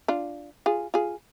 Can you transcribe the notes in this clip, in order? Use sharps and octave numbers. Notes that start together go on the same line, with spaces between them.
D4 F4
F4 G#4
F4 G#4